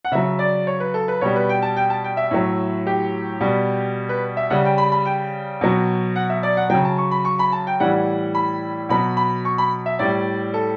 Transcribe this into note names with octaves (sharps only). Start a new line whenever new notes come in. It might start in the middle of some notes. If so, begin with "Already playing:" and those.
F#5
C#3 F#3 E5
D5
C#5
B4
A4
B4
B2 G3 C#5
B4
G5
A5
G5
A5
G5
E5
A2 F#3
G4
B2 G3
B4
E5
C#3 G3 F#5
G5
B5
B5
G5
B2 F#3
F#5
E5
D5
F#5
C#3 F#3 G5
A5
C#6
B5
C#6
B5
A5
G5
A2 E3 G3 F#5
B5
B2 F#3 B5
B5
C#6
B5
E5
A2 G3 D5
A4